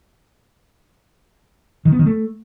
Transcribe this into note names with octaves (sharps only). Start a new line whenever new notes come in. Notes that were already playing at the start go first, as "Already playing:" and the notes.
D#3
B3
D#3
A3